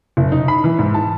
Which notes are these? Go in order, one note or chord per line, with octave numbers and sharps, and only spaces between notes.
F#1
D#4
B5
E3
G#2
A5